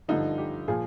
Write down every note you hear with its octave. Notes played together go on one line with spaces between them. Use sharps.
G2 D3 F3 D#4
G4
A#2 F3 G#4